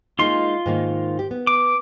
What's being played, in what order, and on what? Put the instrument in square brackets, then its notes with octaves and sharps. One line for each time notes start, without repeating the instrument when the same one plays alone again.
[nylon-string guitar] G#3 A#3 D#4 [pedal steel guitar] F4 C6
[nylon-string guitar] G#2 D#3 A#3
G4
B3
[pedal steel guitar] D6